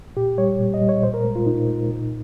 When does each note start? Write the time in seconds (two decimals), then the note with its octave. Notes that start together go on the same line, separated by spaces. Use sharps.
0.16 A#2 G4
0.38 G3 C#5
0.60 A#2
0.74 D#5
0.81 G3
0.89 C#5
1.03 A#2 C5
1.14 A#4
1.24 G#3
1.36 F4
1.46 A#2 D#4
1.68 G#3
1.89 A#2